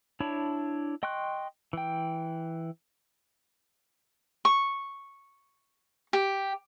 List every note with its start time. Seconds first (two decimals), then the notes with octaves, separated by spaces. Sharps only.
0.20 D4 E4 C#5 A5 B5
1.03 D#5 G5 C6 C#6 F#6
1.73 E3 G5
4.45 C#6
6.13 G4